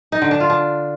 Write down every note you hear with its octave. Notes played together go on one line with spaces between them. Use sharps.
D#4
D3
D4
F4
D4